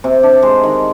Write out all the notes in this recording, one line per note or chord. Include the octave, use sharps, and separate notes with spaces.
C3
D4
G#3
D#3